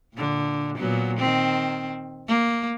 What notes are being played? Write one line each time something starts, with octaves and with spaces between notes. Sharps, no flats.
A#2 D3
A#2 F#3 B3
D#3 C4
A#3